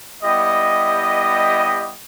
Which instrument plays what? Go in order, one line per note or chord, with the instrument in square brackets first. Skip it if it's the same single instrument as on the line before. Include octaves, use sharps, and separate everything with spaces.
[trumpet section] G3 B3 E4 G4 D#5